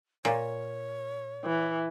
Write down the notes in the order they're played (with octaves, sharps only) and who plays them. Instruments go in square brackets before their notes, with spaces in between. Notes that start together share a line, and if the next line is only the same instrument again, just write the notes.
[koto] A#2 [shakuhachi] C#5
[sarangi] E3